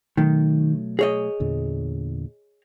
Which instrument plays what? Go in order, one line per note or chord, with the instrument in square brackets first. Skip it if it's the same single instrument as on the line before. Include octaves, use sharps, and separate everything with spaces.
[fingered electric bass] B2 F#3 A3 [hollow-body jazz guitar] D#3
[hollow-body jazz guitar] G#4 C#5 D#5
[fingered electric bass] E2 A#2 D3